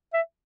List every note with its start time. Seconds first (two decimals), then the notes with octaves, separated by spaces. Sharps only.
0.14 E5